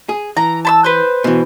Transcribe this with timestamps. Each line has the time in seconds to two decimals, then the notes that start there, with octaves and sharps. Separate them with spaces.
0.09 G#4
0.37 E3 A#5
0.65 A5 B5 E6
0.84 B4 C5
1.24 B2 E3